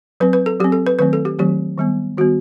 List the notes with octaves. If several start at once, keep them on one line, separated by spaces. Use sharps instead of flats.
F#3 C4 B4
B4
A4
F#3 C4 G4
A4
B4
D#3 F#3 A3 C4 B4
A4
G4
D#3 F#3 A3 C4 G4
D#3 G3 B3
D#3 G3 B3 F#4